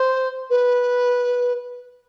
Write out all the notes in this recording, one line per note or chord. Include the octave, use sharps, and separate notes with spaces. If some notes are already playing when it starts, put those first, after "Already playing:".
Already playing: C5
B4